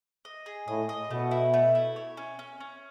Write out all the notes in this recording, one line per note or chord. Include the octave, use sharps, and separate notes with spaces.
D#5
G#4
A2 D#5
D#5
B2 A3
E4
A3
E4
C#5
C#4
C#4
C#4